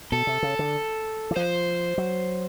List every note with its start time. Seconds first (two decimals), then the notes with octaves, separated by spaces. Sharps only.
0.12 B2 A4
0.27 C3
0.43 C#3
0.59 D3
1.31 E3
1.36 F3 C5
1.98 F#3